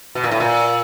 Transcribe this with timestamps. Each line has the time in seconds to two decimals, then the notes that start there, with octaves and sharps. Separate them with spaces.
0.15 B2
0.24 A#2
0.31 A2
0.40 A#2